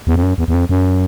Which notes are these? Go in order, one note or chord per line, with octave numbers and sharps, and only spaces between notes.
E2
F2
F#2
E2
E2
F2
F#2